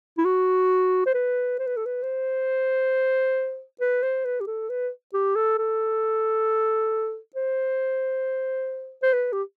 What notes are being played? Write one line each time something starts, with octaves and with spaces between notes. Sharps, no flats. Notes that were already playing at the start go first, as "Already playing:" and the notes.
E4
F#4
C5
B4
C5
B4
A4
B4
C5
B4
C5
B4
G4
A4
B4
G4
A4
A4
C5
C5
B4
G4